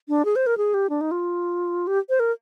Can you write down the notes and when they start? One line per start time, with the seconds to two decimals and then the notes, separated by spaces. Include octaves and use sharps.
0.08 D4
0.25 G#4
0.36 C5
0.46 A#4
0.57 G#4
0.74 G4
0.89 D4
1.01 D#4
1.11 F4
1.87 G4
2.09 C5
2.19 A#4